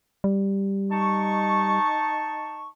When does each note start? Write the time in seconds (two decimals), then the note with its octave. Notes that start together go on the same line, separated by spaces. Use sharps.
0.24 G3
0.91 D#4 A5 C#6